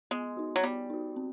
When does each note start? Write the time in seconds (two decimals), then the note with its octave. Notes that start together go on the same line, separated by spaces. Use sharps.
0.11 G#3 B3
0.37 D#4 F#4
0.56 F#3
0.63 G3 B3
0.90 D#4 F#4
1.16 C4